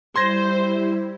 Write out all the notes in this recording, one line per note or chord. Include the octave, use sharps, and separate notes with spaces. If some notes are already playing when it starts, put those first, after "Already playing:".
G3 E4 C5 C6 G#6 A#6